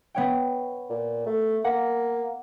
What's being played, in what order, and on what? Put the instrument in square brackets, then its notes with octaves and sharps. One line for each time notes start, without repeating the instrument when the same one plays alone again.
[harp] B3 C#5 G5
[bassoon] A#2
A3
[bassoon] A#3 [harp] F#5